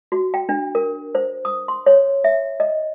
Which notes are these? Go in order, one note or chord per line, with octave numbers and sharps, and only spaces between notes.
F#4
G5
D4
A#4
C5
D#6
C6
C#5
E5
D#5